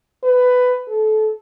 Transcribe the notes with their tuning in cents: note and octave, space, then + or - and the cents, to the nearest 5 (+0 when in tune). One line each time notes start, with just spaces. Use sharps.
B4 +15
A4 -25